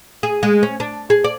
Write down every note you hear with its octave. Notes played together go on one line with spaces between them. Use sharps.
G#4
G#3
C#4
D4
G#4
D5